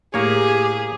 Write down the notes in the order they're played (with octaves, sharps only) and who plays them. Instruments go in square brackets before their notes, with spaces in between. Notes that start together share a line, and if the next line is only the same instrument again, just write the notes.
[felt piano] A2 [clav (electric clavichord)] A#3 C#5 [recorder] G4 [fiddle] G#4